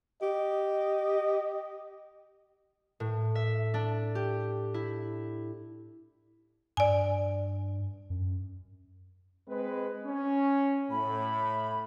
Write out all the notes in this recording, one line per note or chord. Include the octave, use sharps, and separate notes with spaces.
G4 D#5
A2
E5
D4
G4
E4
G2 D5 G#5
F#2
G#3 C4 B4
C#4
A2 B5